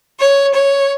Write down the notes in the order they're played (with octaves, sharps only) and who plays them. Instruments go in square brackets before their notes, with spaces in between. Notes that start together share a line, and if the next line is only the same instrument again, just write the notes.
[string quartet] C#5
C#5